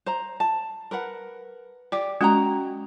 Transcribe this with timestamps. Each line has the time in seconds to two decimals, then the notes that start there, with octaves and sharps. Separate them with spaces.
0.06 C5 A#5
0.40 A5
0.91 A#4 B4 F#5
1.92 G4 D5 D6
2.21 G#3 C#4 F#4 G5 A#5